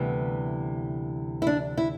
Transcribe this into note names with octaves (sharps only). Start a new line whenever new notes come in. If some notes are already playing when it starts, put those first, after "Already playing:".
Already playing: D2 C3 E3 G3 B3
E4
D4
E4